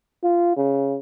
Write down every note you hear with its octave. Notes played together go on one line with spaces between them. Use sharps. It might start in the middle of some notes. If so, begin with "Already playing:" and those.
F4
C#3